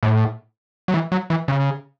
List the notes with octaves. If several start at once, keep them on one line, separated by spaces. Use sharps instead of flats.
A2
F#3
E3
F#3
E3
C#3